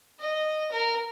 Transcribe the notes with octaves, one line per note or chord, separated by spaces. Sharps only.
D#5
A#4